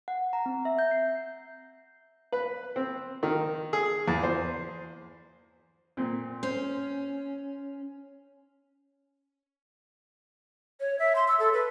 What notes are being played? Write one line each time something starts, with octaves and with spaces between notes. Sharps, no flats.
F#5
A#5
C4
E5
G6
C7
B4
C4
D#3
G#4
E2
C5
A#2 C4
C#4 C5
C#5
E5
C6
E6
A4
B4